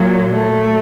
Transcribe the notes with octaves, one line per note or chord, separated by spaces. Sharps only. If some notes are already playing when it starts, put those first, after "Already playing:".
Already playing: A#2 F#3
A3